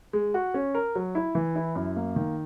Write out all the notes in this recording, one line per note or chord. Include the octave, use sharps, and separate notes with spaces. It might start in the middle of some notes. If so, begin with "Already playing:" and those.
G#3
F#4
C#4
A#4
F#3
E4
E3
E4
F#2
A#3
D#3